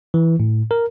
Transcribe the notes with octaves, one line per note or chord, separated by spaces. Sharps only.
E3
A2
A#4